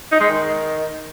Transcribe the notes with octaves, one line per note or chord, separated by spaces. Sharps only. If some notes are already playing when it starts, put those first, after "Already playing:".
D#4
G#3
D#3